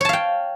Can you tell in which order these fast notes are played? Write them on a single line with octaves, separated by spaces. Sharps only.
C#5 A5 F5 G5